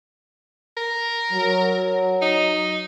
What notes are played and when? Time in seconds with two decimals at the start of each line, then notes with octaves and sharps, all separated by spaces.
0.77 A#4
1.32 F#3
2.22 D#4